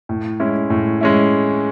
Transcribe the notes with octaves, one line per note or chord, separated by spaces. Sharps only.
A2
G#3 C#4 E4
A2
G#3 C#4 E4